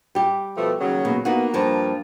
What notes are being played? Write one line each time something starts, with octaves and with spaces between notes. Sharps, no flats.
G3 G4
B2 F3 A3
D#2 C#3 F#3
B2 A#3
A#3 B3 D#4 F#4
G2 F3 A5